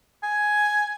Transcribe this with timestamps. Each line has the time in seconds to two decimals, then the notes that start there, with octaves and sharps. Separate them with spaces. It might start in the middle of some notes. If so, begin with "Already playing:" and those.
0.23 G#5